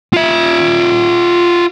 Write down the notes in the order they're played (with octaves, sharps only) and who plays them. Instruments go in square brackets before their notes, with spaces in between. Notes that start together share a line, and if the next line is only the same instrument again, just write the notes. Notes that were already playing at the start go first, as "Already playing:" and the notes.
[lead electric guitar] F4 E5